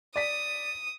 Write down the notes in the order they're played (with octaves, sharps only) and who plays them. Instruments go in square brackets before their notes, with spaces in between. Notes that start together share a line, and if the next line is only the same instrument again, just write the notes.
[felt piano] D5 B6 [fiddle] D#6